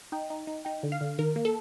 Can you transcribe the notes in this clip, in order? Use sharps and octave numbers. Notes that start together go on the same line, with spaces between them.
D#4 G5
D#4
D#4
D#4 G5
D3
F5
D3
D#3 A#4
A#3
A4